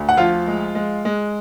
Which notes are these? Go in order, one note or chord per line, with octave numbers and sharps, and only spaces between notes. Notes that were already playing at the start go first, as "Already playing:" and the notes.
Already playing: D2 D3
F#5
F3 F4 F5
G#3
G#3
G#3